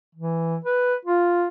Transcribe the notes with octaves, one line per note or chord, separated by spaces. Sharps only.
E3
B4
F4